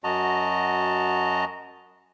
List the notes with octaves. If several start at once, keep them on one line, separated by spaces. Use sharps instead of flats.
F#2 F#4 D#5 A5 A#5